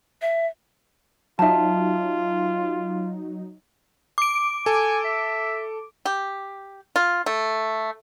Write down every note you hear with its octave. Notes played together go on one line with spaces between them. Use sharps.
E5
F#3 D#4 F4 E5 A5
D6 D7
A4 G#5
E5
G4
F4
A3